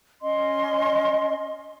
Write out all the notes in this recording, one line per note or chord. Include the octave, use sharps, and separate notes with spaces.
C#4 D#5 C6